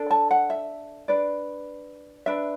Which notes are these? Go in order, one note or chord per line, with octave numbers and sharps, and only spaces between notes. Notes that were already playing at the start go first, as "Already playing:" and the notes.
Already playing: D4 A4
A5
F#5
E5
D4 B4 D5
D4 B4 E5